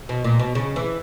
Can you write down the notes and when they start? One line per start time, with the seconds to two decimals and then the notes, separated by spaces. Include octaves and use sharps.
0.09 B2
0.24 A#2
0.39 B2
0.55 C#3
0.76 E3